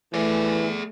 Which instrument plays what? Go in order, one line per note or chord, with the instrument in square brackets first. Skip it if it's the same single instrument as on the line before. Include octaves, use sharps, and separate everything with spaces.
[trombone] E3 [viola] A3 [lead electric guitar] G#4 D5